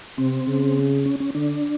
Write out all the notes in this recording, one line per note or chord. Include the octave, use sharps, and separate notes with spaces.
C3 C4
C#3
C#4
C#4
D3 D4